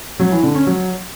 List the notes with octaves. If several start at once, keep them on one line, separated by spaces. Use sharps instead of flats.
F#3
E3
D3
C#4
F#3